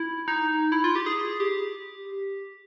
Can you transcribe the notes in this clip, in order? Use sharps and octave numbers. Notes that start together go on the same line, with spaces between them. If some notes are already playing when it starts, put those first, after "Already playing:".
Already playing: E4
D#4
E4
F4
G4
G#4
G#4
G4